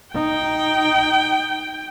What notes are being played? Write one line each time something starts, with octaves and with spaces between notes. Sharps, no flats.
D#4 G5